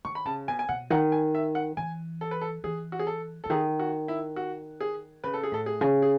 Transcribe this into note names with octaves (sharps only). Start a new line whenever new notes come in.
D#3 C#6
B5
C#3 A5
B2 G#5
G#5
B2 F#5
D#3 F#5
G#5
E5
F#5
E3 G#5
A4
B4
A4
E3 G#4
F#4
G#4
A4
C#3 A4
D#3 G#4
F#4
E4
F#4
G#4
C#3 B4
A4
G#4
A2 A4
G#4
C#3
G#4